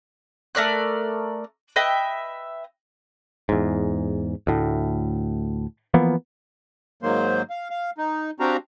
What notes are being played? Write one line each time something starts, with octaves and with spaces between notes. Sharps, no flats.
A3 A#4 D5 F#6
B4 D#5 E5 G5
E2 G#2
D2 A2
E3 F3 A#3 B3
G#2 D#3 F#3 A#3 C5
F5
F5
D#4
C4 D4 F#4 G4 F5 A#5